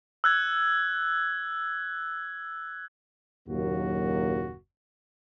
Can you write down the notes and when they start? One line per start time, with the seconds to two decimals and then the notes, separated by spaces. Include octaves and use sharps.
0.24 E6 F#6 G#6
3.49 F#1 D#2 A#2 F#3 A#3 F#4